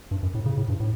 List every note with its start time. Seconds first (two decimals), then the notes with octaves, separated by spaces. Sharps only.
0.11 G2
0.23 F#2
0.35 A2
0.46 C#3
0.57 A2
0.69 G2
0.80 A2